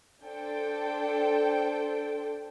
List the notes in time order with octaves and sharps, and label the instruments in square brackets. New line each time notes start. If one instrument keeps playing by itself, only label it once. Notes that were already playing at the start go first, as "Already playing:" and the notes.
[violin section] D4 A4 C5 G5